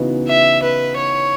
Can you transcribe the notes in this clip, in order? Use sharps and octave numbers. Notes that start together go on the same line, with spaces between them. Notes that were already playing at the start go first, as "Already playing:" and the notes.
Already playing: C#3 E3 B3 D#4 F#4
E5
B4
C#5